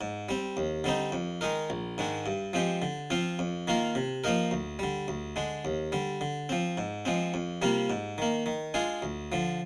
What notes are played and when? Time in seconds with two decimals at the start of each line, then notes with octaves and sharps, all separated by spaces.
0.01 G#2
0.29 G3 C4
0.57 D#2
0.84 D3 G3 C4 D#4
1.12 F2
1.41 D#3 G#3 D#4 A#4
1.70 A#1
1.98 G#2 D#3 G#3 D4
2.26 G2
2.53 F3 G#3 C4 G4
2.82 D3
3.10 F3 C4 F4
3.39 F2
3.67 D#3 A#3 F4 A#4
3.95 C3
4.24 F3 A#3 D#4 A#4
4.51 D2
4.79 D3 G3
5.08 D2
5.36 D3 G#3 D4
5.65 D#2
5.92 D3 G3
6.21 D3
6.49 F3 C4
6.78 G#2
7.05 F3 G#3 C4
7.34 F2
7.62 C3 G3 A#3 F4
7.90 G#2
8.18 D#3 A#3
8.46 D#3
8.74 G#3 D4 F4 G#4
9.02 D2
9.32 D3 F3